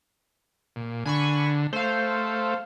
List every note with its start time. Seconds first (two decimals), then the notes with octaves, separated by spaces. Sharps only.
0.76 A#2
1.06 D3 G#5 B5 C#6
1.73 A3 C5 F5